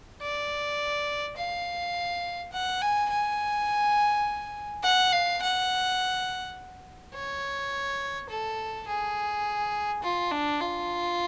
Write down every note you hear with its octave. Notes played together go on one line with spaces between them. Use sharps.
D5
F5
F#5
G#5
G#5
F#5
F5
F#5
C#5
A4
G#4
F4
D4
F4